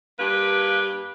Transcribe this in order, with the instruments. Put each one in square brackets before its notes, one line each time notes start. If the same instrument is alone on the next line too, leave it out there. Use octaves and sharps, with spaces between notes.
[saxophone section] G2 A#3 G4 B4